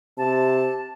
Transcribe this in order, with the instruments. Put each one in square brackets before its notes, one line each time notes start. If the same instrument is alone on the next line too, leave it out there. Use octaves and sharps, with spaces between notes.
[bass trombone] C3 [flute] A5